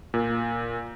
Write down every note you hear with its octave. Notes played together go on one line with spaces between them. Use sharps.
A#2